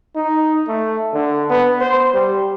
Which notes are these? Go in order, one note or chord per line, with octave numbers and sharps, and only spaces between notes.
D#4
A3
D3
B3
C5
G3